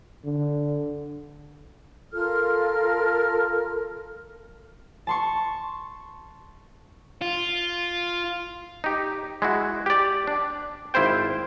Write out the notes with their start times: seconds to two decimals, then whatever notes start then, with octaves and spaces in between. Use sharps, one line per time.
0.25 D3
2.12 F4 A4 A#4 F6
5.07 A5 C6 C#6
7.22 F4
8.84 D#4 G4
9.42 G#3 E4 F#4
9.86 G4 D5
10.27 D4
10.94 G#1 E4 F4 C5 G5